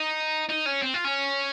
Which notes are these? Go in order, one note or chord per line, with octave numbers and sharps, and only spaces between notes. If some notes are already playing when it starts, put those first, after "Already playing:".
Already playing: D#4
D#4
C#4
C4
F4
C#4